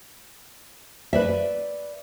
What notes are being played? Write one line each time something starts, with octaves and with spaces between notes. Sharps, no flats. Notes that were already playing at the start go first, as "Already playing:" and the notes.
B4 D5 E5